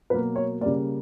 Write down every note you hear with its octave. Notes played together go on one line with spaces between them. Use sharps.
B2 F#3 A#3 B4
C#5
C#3 G3 A#3 D5